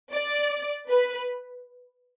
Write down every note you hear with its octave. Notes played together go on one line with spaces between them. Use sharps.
D5
B4